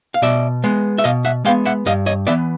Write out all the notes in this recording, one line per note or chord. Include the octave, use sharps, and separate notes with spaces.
F5
B2 D5 E5
G#3 B3
E5
B2 D#5 F5
E5 F#5
G#3 B3 F5 G5
E5 F#5
G2 D#5 F5
C#5 D#5
E3 G#3 B3 D5 E5